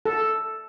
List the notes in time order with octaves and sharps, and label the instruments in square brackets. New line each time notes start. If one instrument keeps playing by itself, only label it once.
[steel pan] A4